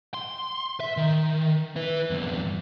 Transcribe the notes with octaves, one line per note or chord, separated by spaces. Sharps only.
C6
E5
D#3
E4 B4
E2 G2